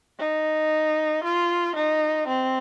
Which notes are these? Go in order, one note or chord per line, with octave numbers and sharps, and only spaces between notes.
D#4
F4
D#4
C4